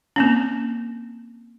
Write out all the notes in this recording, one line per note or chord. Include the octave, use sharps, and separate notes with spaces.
A#3 C4 C#4